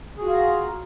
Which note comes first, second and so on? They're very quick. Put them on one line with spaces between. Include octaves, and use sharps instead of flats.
G#4 F#4 F4 F5 A#5